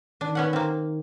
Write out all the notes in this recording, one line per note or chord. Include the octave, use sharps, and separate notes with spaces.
D#3 D4
B3 C#4 F#5
A#3 C4